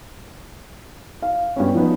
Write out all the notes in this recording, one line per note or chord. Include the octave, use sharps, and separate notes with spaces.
F5
G2 B3 C#4
F3 B3 D#4